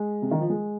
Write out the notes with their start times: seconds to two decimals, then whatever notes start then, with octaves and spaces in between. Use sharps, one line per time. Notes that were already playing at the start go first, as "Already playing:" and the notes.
Already playing: G#3
0.22 C3
0.31 D#3
0.40 F3
0.50 G#3